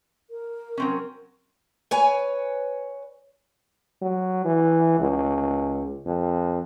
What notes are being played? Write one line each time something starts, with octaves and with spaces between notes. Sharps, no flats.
A#4
F#3 C4 C#4
B4 C#5 G#5
F#3
E3
C#2
F2